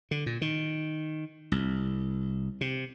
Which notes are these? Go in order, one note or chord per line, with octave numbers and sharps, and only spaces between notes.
D3
A#2
D#3
C2
C3